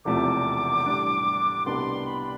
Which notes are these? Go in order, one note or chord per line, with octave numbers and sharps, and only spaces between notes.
E1 E2 C3 F3 A3 D6
A2 G3 D4
C2 B2 B3 D4 G4 C6
B5